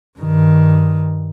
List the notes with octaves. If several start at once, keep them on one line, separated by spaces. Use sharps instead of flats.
G2 D#3